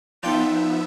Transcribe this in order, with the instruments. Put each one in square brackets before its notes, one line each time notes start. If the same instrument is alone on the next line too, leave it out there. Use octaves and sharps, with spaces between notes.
[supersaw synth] F3 B3 E5 [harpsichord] D4 F4 G5 [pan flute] D#4